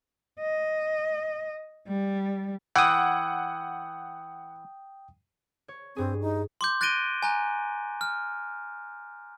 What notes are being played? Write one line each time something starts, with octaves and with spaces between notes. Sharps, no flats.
D#5
G3
E3 F#5 G5 D#6
C#5
G2 C4 G#4
D#4
C6 D6 G6
F#6 A6 A#6 D7 D#7 G7
G#5 A#5 F#6
F6